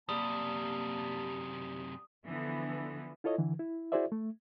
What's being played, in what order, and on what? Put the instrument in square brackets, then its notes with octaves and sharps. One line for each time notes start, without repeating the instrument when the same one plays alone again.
[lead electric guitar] F#2 C3 [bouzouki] G3 [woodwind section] A#3 A5 [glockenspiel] D#6
[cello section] D3 E3 F3 B3
[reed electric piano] E4 F4 A4 C#5 D#5
D3 E3
E4
E4 F#4 G#4 C5 D5 E5
A3